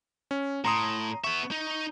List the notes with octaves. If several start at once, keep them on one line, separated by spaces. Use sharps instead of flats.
C#4
A2 A#5 C6 D#6
B3 E5 C#6
D#4